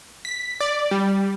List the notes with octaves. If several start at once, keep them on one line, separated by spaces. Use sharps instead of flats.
B6
D5
G3